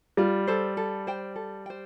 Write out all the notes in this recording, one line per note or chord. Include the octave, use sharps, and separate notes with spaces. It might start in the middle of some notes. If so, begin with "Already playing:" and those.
G3 F4
A4 C5
A4
C5 G5
A4
C5 G5